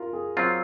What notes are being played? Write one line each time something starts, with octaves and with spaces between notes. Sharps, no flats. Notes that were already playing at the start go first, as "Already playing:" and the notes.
Already playing: F4 A#4
G#4
F#3 C4 F4